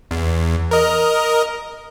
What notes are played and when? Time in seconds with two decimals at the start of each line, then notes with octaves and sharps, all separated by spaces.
0.11 E2
0.71 A#4 D#5